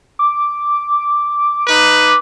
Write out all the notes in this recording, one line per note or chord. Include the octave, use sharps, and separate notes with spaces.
D6
D#4 B4